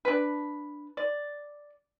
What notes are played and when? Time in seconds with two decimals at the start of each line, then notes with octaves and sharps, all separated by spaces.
0.05 D4 B4
0.97 D5